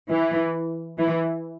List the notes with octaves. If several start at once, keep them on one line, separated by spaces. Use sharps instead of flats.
E3
E3